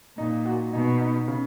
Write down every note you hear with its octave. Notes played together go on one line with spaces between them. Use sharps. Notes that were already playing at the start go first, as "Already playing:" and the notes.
A#2 D#4
F#4
B2 D#4
D#4
C#3